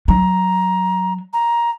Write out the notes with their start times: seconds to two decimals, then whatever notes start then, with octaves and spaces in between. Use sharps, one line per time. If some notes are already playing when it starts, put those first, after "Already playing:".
0.08 F#3 A#5
1.33 A#5